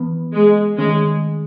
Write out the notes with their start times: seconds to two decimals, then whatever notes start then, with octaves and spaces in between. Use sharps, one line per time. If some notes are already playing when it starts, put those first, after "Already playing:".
Already playing: E3 B3
0.34 G#3
0.78 D#3 G#3 A3 C#4